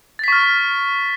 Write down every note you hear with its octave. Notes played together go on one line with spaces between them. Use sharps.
C#6 F6 A6 B6